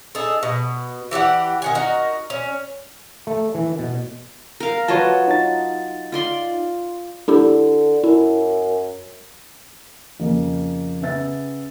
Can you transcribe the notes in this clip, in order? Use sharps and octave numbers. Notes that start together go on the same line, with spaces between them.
D#4 G#4 A4
B2
E3 G4 D5 F#5
D#3 F#5 G#5
D#4 F#4 A#4
C#4
A3
E3
B2
A#4 F5
F#3 F4 B4 C#5 D#5 A5
D#4 A6
F4 D5 C6
D3 D4 E4 G4
F#2 E4
F2 C#3 A#3
C#3 B3 E5 A6